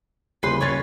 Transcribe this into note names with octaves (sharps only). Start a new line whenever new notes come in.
D#1 C#3 B4 C5 C6
D#1 C#4 B4 C#5 A6